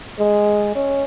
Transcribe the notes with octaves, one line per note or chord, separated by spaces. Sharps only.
G#3
C#4